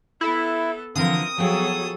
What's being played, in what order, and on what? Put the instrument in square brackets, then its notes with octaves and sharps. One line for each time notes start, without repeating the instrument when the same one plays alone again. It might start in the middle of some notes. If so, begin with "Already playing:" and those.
[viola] B3 A4 [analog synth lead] E4
[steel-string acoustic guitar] D3 E3 F3 [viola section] C4 [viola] A#4 [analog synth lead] D#6
[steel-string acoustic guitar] F3 G5 [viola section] F#3 B3 C#5 [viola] G#4 A4